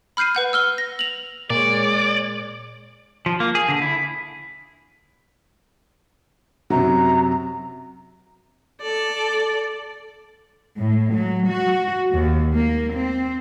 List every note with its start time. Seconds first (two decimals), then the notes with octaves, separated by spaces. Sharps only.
0.17 B5 F6 G6 C7 D#7
0.35 B4 F#5 G6
0.53 E6 F6 G7
0.78 A#6
0.99 F7 F#7
1.50 A#2 G#3 C#5 D5
3.26 F3
3.40 A#3
3.55 G#4
3.69 D3
3.82 E4
6.70 F#2 C3 F#3 A#5
8.82 A4 D5
10.77 A2
11.14 F#3
11.48 F#4
12.13 D#2
12.55 A#3
12.94 C4